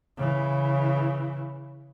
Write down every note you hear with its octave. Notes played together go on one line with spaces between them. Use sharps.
C#3 E3